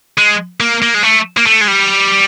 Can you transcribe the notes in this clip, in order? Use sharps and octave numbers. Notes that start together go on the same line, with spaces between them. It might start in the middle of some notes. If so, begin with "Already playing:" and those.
G#3
A#3
A#3
G#3
A3
A#3
A3
G#3
G3